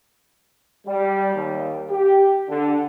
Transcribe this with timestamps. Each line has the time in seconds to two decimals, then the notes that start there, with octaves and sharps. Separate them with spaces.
0.87 G3
1.34 D#2
1.91 G4
2.49 D3